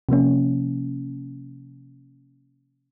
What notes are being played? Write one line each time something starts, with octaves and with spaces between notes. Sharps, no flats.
C3 F3 A#3 C#4